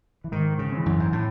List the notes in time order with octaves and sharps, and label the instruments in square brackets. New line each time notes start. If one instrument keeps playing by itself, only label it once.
[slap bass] E3
[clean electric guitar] G#2 [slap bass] D#3
[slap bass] C#3
[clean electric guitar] E3 C4
[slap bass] F#2
G#2
A2